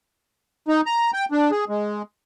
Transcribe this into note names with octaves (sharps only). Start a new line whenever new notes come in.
D#4
A#5
G5
D4
G#4
G#3